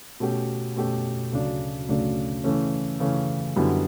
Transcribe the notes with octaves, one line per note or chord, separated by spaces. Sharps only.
B2 A3 C#4 G4
B2 A3 C#4 G4
D2 C#3 F#3 A3 D4
D2 C#3 F#3 A3 D4
C#3 E3 A3 C#4
C#3 E3 A3 C#4
F#2 D3 G3 B3 E4